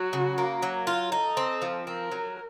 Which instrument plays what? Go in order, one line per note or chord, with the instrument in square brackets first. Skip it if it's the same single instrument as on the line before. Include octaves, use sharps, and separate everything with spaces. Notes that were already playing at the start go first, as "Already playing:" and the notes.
Already playing: [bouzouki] F#3 [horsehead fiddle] F#4
[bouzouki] C#3
A#3
F#3
F4
[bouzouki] D#4 [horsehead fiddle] A4
[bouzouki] C4
F3
[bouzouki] C4 [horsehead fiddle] A#4
[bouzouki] F#3